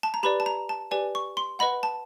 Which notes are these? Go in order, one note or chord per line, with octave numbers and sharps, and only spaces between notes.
A5
A#5
G4 B4 D5 B5
A5
A#5
A5
G4 B4 D5 G#5
C#6
C6
B4 D#5 F#5 B5
A5